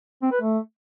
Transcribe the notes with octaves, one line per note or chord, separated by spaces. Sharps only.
C4
B4
A3